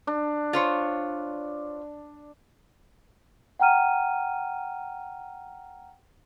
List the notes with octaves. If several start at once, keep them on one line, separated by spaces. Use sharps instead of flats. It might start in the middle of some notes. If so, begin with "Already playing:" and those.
D4
F4 C5 C#5
F#5 G5 A#5 F6 D#7